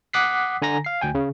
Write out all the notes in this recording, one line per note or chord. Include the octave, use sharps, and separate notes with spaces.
F#5 D6 D#6 F#6 B6 C7
D3 G#5 A#5 A#6
F5 C7
D2 G5 G#5
C#3